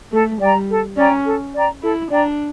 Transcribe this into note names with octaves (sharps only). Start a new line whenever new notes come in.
A3 A4
G3 D5 G5 A#5
A4
C#4 D5 G5 A#5
A4
D5 G5 A#5
E4 A4
D4 D5 G5 A#5